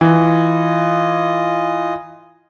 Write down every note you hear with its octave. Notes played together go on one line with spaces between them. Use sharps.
E3 F4 D#5